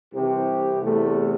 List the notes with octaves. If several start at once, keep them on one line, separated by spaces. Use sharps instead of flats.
C2 C3 E3 G4
E2 C3 E3 A3